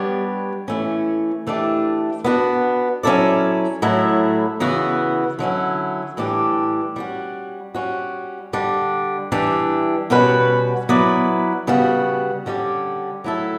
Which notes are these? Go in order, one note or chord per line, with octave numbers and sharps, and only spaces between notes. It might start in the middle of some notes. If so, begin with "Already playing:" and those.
Already playing: G3 B3 D4 G4 C#5
E3 A3 C#4
E3 A3 D4 G4
B3 D4 F#4
F#3 C#4 E4 A4 D5
A2 F#3 A3 E4
C#3 E3 B3 F#4
D3 F#3 C#4 E4
A2 E3 G3 D4 G4
G3 C#4 F#4
G3 C#4 F#4
D3 G3 D4
E3 G3 D4 G4
B2 G3 C#4 F#4 B4
F#3 B3 E4 B4 D5
C#3 G3 B3 F#4
D3 G3 C#4 G4
F#3 A3 E4 A4